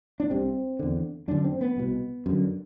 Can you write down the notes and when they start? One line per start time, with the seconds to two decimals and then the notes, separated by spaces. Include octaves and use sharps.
0.20 D4
0.30 C2 C3 C4
0.79 E2 D3
1.28 F#2 D3 D4
1.44 C4
1.61 B3
1.76 C2 B2
2.26 F#2 D3